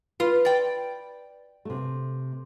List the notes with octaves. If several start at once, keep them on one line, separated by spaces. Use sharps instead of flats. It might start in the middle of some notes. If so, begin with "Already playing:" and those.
F4 B4
D5 G5
C3 A3